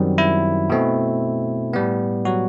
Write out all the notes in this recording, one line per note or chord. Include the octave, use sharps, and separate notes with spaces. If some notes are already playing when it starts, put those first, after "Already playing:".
Already playing: F#2 D#3 F#3 G3 C4 F#4
E4
B2 A3 C4
A2 G3 B3
F#3 F#4